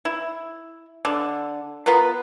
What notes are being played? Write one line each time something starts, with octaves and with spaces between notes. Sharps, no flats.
E4
D3
B3 F4 A#4 B4